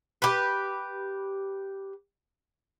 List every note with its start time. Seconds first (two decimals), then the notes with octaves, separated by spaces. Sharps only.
0.22 G4 B4